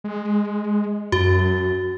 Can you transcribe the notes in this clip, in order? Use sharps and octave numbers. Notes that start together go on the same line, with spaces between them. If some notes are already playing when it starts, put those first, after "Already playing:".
G#3
F#2 F#4